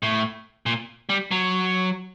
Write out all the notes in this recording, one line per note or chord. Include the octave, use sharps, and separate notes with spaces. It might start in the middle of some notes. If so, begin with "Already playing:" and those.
A2
A#2
G3
F#3